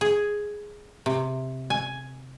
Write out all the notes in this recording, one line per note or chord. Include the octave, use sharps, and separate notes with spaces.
G#4
C3
G#5